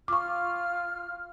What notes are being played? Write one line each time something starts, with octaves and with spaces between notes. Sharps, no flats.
F4 C#6 D6 F6